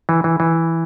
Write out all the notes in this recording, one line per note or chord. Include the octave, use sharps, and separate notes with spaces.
E3
E3
E3